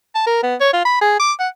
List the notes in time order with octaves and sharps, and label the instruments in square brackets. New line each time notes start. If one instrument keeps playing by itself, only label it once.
[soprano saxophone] A5
A#4
B3
C#5
F4
B5
G#4
D6
F#5